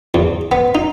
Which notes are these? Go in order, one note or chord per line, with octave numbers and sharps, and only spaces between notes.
E2
B3
D#4